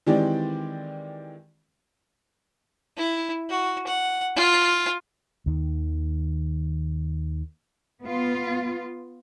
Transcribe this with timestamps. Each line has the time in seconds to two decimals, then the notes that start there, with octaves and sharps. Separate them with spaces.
0.06 D#3 E3 G#3 C4 G4 D5
2.97 E4
3.49 F#4
3.87 F#5
4.36 F4
5.46 D#2 D#3
8.03 B3 F4